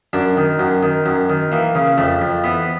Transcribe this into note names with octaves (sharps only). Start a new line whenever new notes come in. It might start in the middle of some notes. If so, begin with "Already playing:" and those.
F#2 D4
D#3
F#2
D#3
F#2
D#3
E3 A#3
C#3
F2 A3
F2
E3 B3